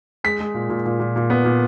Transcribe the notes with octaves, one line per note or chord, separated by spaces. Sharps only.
G#3 B6
G#3
A#2
A#2
A#2
A#2
A#2
B3
A#2